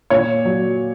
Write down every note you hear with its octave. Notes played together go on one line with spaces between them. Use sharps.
A#2 C#5
F#3